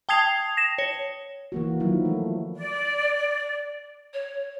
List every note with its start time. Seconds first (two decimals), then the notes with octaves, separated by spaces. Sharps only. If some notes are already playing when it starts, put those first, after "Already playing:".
0.09 G5 A5 D#6 G#6 C7 F7
0.57 A#6 E7
0.78 C#5
1.52 E3 A#3 F#4
1.80 D#3 F3 F#3 E4
2.05 A3
2.56 D5
4.13 C#5